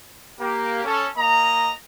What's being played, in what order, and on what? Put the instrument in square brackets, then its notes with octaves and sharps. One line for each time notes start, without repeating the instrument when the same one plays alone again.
[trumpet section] A#3 G4
C#4 A4
A#3 D#5 A#5